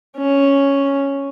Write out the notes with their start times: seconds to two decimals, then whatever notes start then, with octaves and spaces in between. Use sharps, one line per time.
0.17 C#4